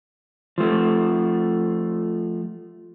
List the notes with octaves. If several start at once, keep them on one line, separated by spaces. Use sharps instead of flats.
F3 A3